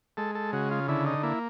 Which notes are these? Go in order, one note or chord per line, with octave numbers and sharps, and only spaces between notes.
G#3 A4
A4
C#3 F#4
F4
D3 E4
D#4
A#3 E4